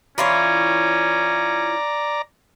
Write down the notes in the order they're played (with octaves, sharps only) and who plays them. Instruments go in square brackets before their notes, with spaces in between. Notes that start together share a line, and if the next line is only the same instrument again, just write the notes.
[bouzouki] E3 F4 C#5 [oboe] C#4 [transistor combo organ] D5 A#5